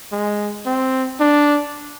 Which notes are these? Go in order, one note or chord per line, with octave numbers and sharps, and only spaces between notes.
G#3
C4
D4